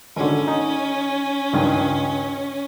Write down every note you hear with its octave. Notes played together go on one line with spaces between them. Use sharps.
G#1 D3 C#4
D#4
C#2 G2 D#3